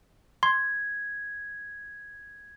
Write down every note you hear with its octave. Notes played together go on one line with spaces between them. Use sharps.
C6 G#6